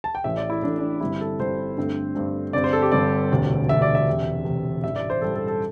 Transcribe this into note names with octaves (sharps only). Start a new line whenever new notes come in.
A5
G5
A1 A2 A3 E5
D5
E4
A1 A2 A3 D4
D4
G1 G2 G3 C4 E4
A4
G1 G2 G3 C4 C5
G2 D3 A3 C4
G2 D3 A3 C4
G1 G2 G3 C4 D5
C5
A4
G4
G1 G2 G3 C4 D5
E1 D2 C3
E1 D2 C3 E5
D5
E5
E1 E2 C3
E1 E2 C3
A1 G2 G3 E5
D5
C5
A1 G2 G3 A4
A4
A4